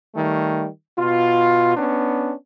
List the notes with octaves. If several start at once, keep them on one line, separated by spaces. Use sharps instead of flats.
D#3 G3 A3
B2 F4
B3 C#4 D4